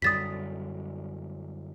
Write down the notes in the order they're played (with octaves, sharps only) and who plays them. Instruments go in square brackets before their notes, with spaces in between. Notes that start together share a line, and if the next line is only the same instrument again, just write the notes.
[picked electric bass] F#2 D3 G3 [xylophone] D#6 A6 B6